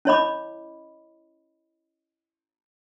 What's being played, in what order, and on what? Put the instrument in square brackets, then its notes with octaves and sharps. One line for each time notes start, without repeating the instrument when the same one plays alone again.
[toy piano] C#4 E4 C#5 D#5 B5 D6